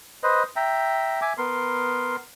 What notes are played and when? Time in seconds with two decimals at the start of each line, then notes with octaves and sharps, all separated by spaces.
0.23 B4 C5 D#5
0.56 E5 G5 A#5
1.22 E5 G#5 D6
1.38 B3 A#4 C6